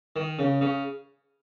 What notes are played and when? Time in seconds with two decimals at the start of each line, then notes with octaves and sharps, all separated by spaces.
0.16 D#3
0.39 C#3
0.61 C#3